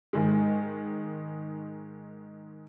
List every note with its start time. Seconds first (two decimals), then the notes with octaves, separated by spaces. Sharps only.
0.13 G#2 D#3 G#3